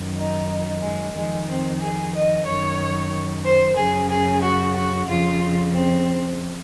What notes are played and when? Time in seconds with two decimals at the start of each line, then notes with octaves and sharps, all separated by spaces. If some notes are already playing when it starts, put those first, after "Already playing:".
Already playing: F#2 D#3
0.16 D#4
0.81 G#3
1.14 F2 D#3 G#3
1.47 C4
1.80 G#4
2.13 D#5
2.46 F#2 D#3 C#5
3.44 C5
3.76 F#2 C#3 G#4
4.09 G#4
4.42 F#4
4.75 F#4
5.08 F2 C#3 F4
5.73 C4